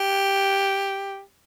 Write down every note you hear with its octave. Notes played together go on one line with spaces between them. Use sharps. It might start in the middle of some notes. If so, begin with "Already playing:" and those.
Already playing: G4